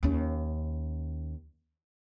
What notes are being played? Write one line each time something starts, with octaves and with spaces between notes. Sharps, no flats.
D#2 C#4